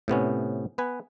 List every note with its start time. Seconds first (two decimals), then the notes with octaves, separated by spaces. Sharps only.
0.08 A2 C3 B3 C#4
0.78 B3 B4 G#5